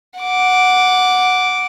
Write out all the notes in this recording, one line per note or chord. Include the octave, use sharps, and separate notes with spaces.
F#5 D6